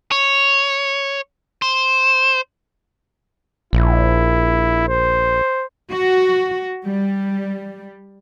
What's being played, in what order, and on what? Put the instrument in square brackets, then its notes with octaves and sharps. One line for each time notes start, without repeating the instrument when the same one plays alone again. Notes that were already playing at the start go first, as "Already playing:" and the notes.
[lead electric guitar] C#5
C5
[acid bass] A#1 [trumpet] E4
[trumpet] C5
[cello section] F#4
G3